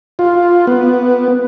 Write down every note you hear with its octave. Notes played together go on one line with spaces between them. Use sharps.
F4
B3